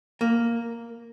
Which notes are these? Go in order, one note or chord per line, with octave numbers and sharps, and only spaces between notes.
A#3